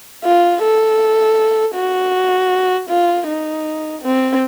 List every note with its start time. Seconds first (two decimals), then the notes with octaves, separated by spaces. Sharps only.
0.24 F4
0.63 A4
1.75 F#4
2.89 F4
3.27 D#4
4.02 C4